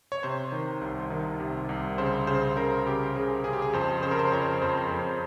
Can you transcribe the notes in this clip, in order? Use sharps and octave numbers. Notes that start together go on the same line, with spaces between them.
C#5
C3 C5
D#3
C2
D#3
C3
C2
C#3 C5
C#3 C5
C#3 A#4
C#3 G4
C#3 G#4
C#3 G#4
G4
G#4
F2 C5
C#3 C5
A#4
C5
F2 C#5
F2 C5
F2